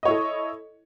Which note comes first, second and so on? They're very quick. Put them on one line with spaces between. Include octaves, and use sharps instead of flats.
D#5 C#5 E4 A4